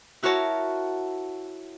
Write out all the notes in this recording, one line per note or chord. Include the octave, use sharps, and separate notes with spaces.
E4 F#4 A#4 C#5 A5